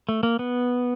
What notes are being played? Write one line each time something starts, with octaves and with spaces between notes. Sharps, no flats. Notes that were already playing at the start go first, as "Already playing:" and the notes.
A3
A#3
B3